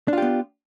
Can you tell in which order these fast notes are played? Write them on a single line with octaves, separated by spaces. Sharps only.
D4 F4 G4 B3